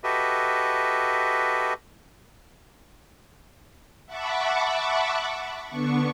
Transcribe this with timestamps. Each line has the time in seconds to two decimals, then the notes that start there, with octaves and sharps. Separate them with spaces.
0.04 F#4 G4 A4 B4 D#5 E5
4.06 E5 F#5 A5 B5 C#6 D6
5.70 D3 B3 D4 C#6